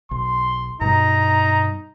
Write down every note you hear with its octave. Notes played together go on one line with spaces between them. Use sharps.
B1 C6
G2 B2 G3 D#4 A#5